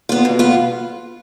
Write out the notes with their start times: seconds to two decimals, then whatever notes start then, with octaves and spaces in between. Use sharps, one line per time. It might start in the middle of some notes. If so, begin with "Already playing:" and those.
0.09 B3 F4
0.25 B2
0.39 B3 F4